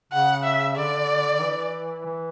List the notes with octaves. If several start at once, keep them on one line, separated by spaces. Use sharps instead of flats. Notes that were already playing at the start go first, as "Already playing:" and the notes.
C#3 F#5
E5
D3 D5
E3
E3